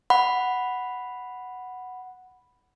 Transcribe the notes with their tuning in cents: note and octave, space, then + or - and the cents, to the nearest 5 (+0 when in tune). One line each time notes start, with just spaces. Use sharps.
F#5 +0 B5 +0